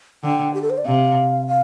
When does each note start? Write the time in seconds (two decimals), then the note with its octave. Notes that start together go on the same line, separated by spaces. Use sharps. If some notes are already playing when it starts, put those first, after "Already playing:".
0.24 D3 G5
0.54 G4
0.62 A4
0.70 C5
0.78 D5
0.86 C3 F5
1.47 F5